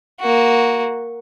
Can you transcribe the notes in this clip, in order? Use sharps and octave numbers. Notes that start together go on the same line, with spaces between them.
A#3 F#4